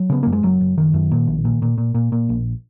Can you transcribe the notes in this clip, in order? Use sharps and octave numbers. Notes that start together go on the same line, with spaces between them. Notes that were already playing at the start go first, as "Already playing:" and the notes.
Already playing: F#3
C#3 B3
F#2 A#3
G#3
F#1 F#3
F#1
F#1 D#3
F#2
A#2
A#1
A#2
A#2
A#2
A#2
A#2
A#1